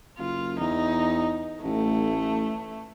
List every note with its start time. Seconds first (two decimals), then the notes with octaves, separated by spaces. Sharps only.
0.19 F#1 F4
0.60 E2 D#4
1.64 A1 A3